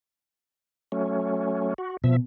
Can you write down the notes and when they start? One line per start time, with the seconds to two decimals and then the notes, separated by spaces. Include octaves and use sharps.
0.92 F#3 A3 C#4
1.78 F#4
2.04 B2 F3 E5